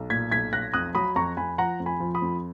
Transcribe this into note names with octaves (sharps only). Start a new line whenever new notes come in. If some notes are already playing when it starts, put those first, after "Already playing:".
Already playing: B1
A#2 G#6 B6
B1 G#6 B6
B1 F#6 A#6
F2 D#6 F#6
F#3 B5 D#6
F2 A#5 C#6
F2 G#5 B5
F3 F#5 A#5
F2
G#5 B5
F3
B5 D#6
F2